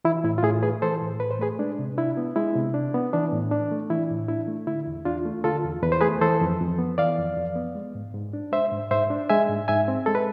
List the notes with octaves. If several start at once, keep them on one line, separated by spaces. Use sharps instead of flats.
E3 E4
A2 E4
F4
A2 E4 G#4
A3 G#4 B4
E3 A4 C5
A2
A2 B4
C5
A3 G#4 B4
G#3 D4
C3
D4 E4
B3
G#3 E4
C3
D4
B3
E3 D4
A2
D4
A3
E3 E4
A2
D4 E4
A3
D3 E4
E2
E2 D4 F4
A3
D3 F4 A4
E2
E2 B4
C5
A3 G#4 B4
E3 A4 C5
F2
F2
B3
E3 D5 F5
F2
F2
B3
G#3
G#2
G#2
D4
G#3 C5 E5
G#2
G#2 C5 E5
D4
G#3 E5 G#5
G#2
G#2 E5 G#5
C4
G#3 A4
B4